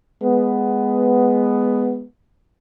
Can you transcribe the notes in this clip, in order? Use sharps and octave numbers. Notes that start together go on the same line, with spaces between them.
G#3 B3